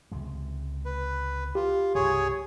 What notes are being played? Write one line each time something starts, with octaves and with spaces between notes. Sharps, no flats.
C#2 C3 G#3
B4
F4 G4
C2 G2 C#3 G#4 C#5